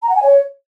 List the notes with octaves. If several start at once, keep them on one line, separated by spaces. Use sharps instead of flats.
A#5
F#5
G#5
C#5